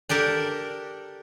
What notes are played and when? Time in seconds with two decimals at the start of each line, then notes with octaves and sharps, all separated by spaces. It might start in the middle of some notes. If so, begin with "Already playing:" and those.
0.09 D4 G4 A4 A#4